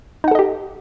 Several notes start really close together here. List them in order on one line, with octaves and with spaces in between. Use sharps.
D#4 F#5 A4 D#5 G4